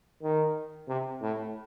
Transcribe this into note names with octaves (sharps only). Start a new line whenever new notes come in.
D#3
C3
A2